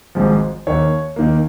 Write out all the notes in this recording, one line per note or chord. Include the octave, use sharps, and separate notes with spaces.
G#1 G#2 F3
D#2 D#3 A#3 C#5
D#2 D#3 A#3